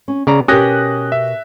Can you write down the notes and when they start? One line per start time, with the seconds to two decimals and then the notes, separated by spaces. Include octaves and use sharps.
0.08 C#4
0.27 C#3 B3 D5 A#5
0.48 B2 C#4 G4 A#4 C#5 D#6 F#6 A#6
1.12 E5